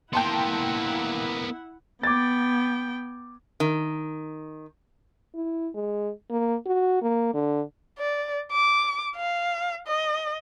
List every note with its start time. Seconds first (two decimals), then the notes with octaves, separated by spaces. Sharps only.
0.13 A#3 B3 E4 F#5 G5 A5 C6
2.03 B3 G5 D6 G#6 A6
3.60 D#3
5.34 E4
5.74 G#3
6.30 A#3
6.66 F#4
7.02 A#3
7.34 D3
7.99 D5
8.52 D6
9.16 F5
9.87 D#5